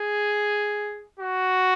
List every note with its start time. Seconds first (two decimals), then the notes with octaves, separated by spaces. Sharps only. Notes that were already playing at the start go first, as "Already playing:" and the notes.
Already playing: G#4
1.19 F#4